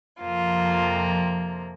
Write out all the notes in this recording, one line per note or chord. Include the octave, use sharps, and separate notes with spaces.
F2 C3 F3 A#3 F4